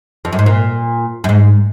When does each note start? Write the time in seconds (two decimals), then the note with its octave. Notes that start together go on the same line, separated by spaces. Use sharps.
0.25 F2
0.32 F#2
0.39 G#2
0.46 A#2
1.24 F#2
1.29 G#2